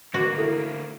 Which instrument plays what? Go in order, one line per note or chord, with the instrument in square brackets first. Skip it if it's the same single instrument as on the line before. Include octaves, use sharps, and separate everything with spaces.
[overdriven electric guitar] D2 A#3 [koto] F#4 [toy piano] B4 D6
[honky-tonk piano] E4 A#4 [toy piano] A4